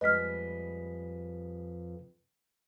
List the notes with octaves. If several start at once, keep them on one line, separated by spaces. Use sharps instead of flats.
F2 G3 G#3 B4 D#5 F6 B6